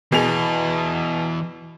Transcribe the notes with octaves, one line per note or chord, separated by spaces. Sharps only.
E2 B2 G#4 F7